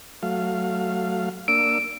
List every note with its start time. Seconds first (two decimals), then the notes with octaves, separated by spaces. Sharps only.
0.23 F#3 A3 F5
1.48 A#3 D4 E6 D7